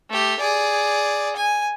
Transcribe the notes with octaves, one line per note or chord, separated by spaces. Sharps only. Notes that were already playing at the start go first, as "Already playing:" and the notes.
A3 G4
G#4 D5
G#5